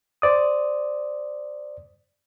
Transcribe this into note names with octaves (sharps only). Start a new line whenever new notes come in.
C5 D5 D#6